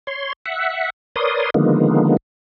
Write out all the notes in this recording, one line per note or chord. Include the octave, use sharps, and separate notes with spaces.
C#5 C6
E5 F#5
A#4 B4 C#5 D5 C6 D#6
D3 D#3 F3 G#3 A#3 B3